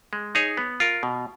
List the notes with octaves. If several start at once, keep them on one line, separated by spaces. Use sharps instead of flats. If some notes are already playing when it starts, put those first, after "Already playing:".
G#3
D#4 G#4 C#5
B3
F4 A#4
B2